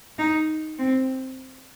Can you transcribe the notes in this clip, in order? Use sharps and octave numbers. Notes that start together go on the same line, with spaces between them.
D#4
C4